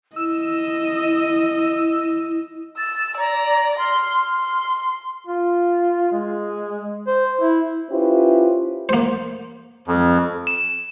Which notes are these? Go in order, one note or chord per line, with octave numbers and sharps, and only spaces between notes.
E4 D#5 E6
E6 A6
D5 A#5
C6 F6
C6
F4
G#3
C5
E4
C#4 E4 F4 G4 B4 C5
A#3 C5
F2
E7